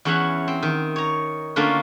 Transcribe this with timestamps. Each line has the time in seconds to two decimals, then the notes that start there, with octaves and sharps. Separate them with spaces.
0.05 E2 E3 C#4 E4 F#5
0.48 C4
0.62 D#3
0.96 C#5 A#5
1.56 D3 A3 A#3 C#4 F4